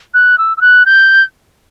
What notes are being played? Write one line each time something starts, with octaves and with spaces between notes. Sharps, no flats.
F#6
E6
E6
F#6
G6